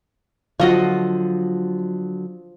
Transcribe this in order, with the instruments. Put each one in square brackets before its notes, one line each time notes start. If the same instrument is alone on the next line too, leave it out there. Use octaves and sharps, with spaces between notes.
[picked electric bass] D3 F#3 [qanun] F3 D#5 C#6 [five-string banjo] F4 F#4